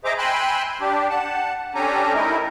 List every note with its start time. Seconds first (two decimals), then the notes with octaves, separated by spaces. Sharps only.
0.05 G#4 C5 D#5 E5 A#5 D6
0.18 G5 G#5 B5 C6 E6 F#6
0.81 D4 G4
1.10 F#5 A5
1.75 C#4 D4 G4 A4 G#5 A#5
2.13 A3 D#4 E4 A#4